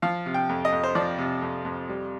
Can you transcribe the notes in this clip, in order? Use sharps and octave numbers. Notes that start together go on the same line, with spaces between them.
F3 F5
C3
G5
F2
D#5
F2
C5
F3 D5
C3
F2
F2
G3